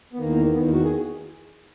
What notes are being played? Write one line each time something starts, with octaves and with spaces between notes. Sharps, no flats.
B3
E2 D#3 A#3
E2 D#3 B3
A#3
F#4
G#4